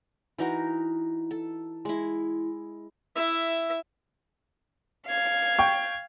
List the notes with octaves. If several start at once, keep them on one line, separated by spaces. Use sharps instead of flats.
E3 D#4 F#4 A#4
A4
G#3 E4
E4 E5
F5 G#6
G5 C#6